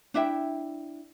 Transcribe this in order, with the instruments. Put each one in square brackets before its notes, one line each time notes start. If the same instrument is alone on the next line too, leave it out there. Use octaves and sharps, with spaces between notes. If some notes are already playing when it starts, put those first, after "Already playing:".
[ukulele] D4 E4 E5 G5